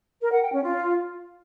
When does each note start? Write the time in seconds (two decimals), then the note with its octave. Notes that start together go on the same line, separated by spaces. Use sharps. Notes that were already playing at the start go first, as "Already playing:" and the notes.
0.21 A#4
0.32 F#5
0.42 G5
0.53 C#4
0.63 F4